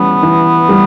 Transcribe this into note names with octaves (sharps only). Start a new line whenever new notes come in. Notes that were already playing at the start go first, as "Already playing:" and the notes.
Already playing: E3 G3 B3 C#4
E3
G3